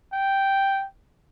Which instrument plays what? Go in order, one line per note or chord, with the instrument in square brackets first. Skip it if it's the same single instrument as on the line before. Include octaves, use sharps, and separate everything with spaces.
[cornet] G5